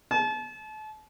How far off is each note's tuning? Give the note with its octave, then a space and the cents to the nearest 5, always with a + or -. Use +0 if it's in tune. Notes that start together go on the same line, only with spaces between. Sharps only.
A5 -35